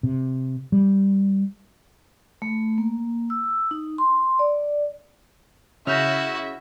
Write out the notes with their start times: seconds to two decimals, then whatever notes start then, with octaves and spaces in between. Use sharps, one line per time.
0.03 C3
0.72 G3
2.42 A3
2.78 A#3
3.30 E6
3.71 D#4
3.98 C6
4.39 D5
5.87 C#3 E4 F#4 E5 F6 G6 A#6